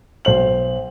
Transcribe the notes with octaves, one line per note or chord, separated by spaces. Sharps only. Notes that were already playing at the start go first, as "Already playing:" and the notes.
B1 C5 F#7